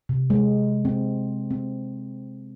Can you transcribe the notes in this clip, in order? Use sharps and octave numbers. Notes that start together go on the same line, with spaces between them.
C3
G#3
C4
C4